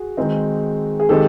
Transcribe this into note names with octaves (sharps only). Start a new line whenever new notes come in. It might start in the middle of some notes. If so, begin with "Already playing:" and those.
Already playing: F#4 G#4
D#3 G#3 C4 D#4
G#4
D#3 G#3 C4 D#4 G4 A4